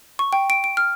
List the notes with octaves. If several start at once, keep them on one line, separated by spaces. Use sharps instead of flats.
C#6
G5
D7
D7
F6